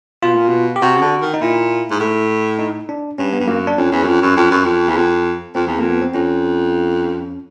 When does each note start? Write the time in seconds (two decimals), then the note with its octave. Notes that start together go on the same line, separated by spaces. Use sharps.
0.23 B2 F4
0.35 A#2
0.48 B2
0.76 G4
0.82 C3 F#4
0.97 C#3
1.01 D3
1.21 D#3
1.34 D#4
1.41 A#2 E4
1.90 G#2
2.00 A2
2.59 D#4
2.89 D4
3.18 G2 C#4
3.33 B3
3.40 G2
3.48 F#2 A#3
3.67 D4
3.77 F2 C#4
3.92 E2
4.03 F#2
4.07 F2
4.22 F#2
4.37 F2
4.51 F#2
4.64 F2
4.88 E2
4.96 F2
5.55 F2 C4
5.67 E2
5.78 F2 A#3
5.90 B3
6.02 C4
6.14 F2 C#4